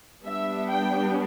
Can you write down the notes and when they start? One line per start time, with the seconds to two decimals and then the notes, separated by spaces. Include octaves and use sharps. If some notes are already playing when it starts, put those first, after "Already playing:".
0.25 G3 B3 D4 E5
0.69 G5